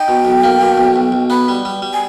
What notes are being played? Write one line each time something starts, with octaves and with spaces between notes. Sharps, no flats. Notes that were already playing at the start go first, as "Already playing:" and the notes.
Already playing: D#4 G5
B2
B1
A#3
B2
B1
B1
B1
B3 B5
G3
G3
G3
G#5